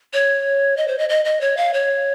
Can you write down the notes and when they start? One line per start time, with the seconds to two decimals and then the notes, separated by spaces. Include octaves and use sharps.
0.13 C#5
0.77 D#5
0.88 C5
0.99 D#5
1.09 D#5
1.25 D#5
1.41 C#5
1.57 F5
1.74 C#5